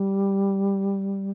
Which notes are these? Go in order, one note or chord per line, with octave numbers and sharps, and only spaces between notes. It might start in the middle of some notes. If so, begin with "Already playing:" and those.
Already playing: G3